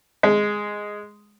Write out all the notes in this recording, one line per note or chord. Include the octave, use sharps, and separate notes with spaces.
G#3